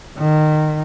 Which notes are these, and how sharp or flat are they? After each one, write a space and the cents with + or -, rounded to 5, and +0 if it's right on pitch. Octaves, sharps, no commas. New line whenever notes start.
D#3 -20